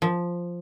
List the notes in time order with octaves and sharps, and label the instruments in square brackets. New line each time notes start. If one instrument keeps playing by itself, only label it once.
[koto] F3